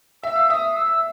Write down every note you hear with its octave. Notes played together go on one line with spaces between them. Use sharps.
E5 E6
F5
E5 D#6
E6